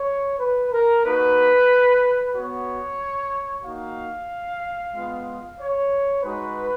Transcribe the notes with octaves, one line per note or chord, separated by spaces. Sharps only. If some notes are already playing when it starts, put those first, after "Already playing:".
Already playing: C#5
B4
A#4
A#3 D#4 F#4 B4
B3 F#4 C#5
A#3 D#4 F#4 F5
G#3 B3 F4
C#5
G#3 D#4 F#4 B4